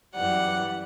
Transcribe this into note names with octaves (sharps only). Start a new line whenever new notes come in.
F#2 E3 G3 F#5